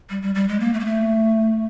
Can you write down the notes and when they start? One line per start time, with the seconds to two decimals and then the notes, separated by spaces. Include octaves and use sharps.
0.10 G3
0.22 G3
0.35 G3
0.48 G#3
0.60 A#3
0.74 A3
0.80 A#3
0.85 A3